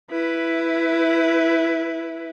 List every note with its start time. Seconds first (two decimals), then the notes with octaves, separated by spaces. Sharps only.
0.11 E4 B4